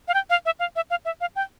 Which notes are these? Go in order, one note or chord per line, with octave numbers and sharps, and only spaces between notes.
F5
G5
F5
E5
F5
E5
F5
E5
F5
G5